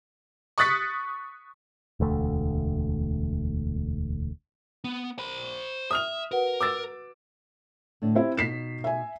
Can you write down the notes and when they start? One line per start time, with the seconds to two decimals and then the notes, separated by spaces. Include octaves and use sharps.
0.58 C#6 D#6 F#6 A6 B6 C#7
2.00 E1 D2 A3
4.84 B3
5.18 C5 B5
5.91 E5 D#6 F6 F7
6.31 F#4 A#4 B4 F#5
6.61 D6 E6 A6
8.02 A2 D3 D4
8.15 C4 E4 G4
8.37 B2 D#4 B6 C7 E7
8.84 E5 G#5